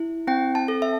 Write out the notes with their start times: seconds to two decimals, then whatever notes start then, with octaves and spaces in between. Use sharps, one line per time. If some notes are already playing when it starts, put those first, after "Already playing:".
Already playing: E4
0.27 C4 G5
0.55 A5
0.68 A4
0.82 E5